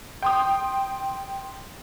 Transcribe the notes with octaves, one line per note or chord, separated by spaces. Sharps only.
G5 C6 D#6